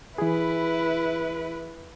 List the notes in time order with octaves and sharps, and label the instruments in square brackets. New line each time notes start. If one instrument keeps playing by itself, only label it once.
[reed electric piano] E3 G#4 [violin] E4 B4